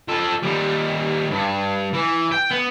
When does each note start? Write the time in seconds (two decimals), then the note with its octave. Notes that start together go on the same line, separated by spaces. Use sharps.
0.08 F3 A4
0.43 D#2 G3
1.30 G2
1.94 E3
2.32 G5
2.51 B3